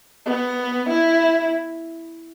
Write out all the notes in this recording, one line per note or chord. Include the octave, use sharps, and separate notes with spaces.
B3
E4